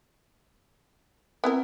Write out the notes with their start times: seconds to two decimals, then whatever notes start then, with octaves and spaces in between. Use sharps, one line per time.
1.44 B3 C4 E4 A#4